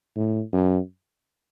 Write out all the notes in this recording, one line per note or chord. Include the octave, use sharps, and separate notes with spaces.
A2
F#2